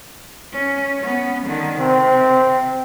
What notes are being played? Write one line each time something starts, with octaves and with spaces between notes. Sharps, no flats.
C#4
B3 C#4
D3 D#3
C3 C4